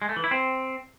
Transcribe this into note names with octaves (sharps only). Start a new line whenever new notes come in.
G#3
A3
E3
E4
C4